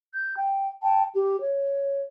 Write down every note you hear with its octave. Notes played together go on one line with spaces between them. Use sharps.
G6
G5
G5 A5
G4
C#5